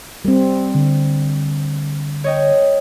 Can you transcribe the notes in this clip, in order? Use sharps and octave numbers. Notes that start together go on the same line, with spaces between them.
G3 C4
D3
C#5 D#5 G5